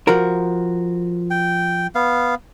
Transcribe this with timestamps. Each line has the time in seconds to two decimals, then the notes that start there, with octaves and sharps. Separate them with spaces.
0.07 F3 F#4 A#4
1.30 G5
1.95 B3 F5